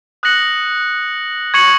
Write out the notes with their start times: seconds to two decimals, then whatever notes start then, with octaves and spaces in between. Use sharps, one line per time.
0.23 D#6 F#6 A#6 C#7 F#7
1.54 C#6 G#6 C#7 F#7